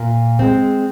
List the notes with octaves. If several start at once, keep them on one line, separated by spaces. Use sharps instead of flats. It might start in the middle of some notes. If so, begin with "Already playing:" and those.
Already playing: A#2
G#3 C4